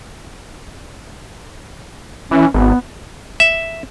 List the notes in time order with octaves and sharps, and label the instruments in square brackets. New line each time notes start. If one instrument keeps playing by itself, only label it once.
[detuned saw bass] E3 [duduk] C#4
[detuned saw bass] G#1 [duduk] B3
[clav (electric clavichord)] E5